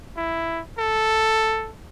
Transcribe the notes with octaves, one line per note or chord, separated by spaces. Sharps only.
E4
A4